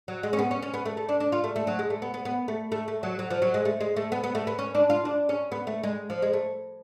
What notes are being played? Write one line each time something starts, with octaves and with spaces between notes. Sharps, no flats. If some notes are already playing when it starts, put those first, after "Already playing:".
F#3
G#3
C#4
B3
C#4
C#4
B3
A3
A3
D4
D4
F4
A3
A3
F#3
G#3
A3
B3
B3
B3
A3
A3
A3
F#3
F#3
F3
F#3
G#3
A3
G#3
A3
B3
B3
A3
B3
C#4
D4
F4
D4
C#4
B3
A3
G#3
F3
G#3
A3